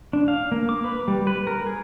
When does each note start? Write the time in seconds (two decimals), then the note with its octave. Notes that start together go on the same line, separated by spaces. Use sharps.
0.13 D4
0.28 F5
0.52 A#3
0.69 D6
0.84 B4
1.08 G3
1.27 B4
1.47 A#4
1.67 G#4